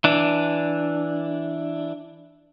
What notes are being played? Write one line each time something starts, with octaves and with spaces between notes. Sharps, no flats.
E3 D4